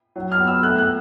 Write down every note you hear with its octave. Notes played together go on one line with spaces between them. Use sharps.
F#3
F6
B3
E6
A3 F#6
F#6